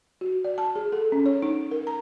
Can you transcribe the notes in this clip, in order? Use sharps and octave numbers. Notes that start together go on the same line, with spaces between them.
F#4
D5
A5
G#4
A4
C#4
C#5
D#4
A#4
A#5